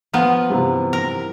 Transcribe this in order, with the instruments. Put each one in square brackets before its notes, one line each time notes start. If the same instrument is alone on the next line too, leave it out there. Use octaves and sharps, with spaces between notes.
[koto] F3 B3 F4 [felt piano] A#5 F6
[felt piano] G2 C3 E3
[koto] A#4